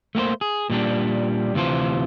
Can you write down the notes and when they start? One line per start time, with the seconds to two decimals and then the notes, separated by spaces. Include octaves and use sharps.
0.15 A3 A#3 G4 C5
0.41 G#4
0.70 A#2 G3 D4
1.54 D2 C3 E3 F4 C5